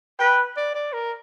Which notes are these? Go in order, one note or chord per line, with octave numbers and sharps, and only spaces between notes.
B4 G5
D5
D5
A#4